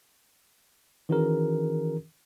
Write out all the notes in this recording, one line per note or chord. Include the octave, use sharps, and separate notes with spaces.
D#3 E3 C#4 F#4 G#4 A#4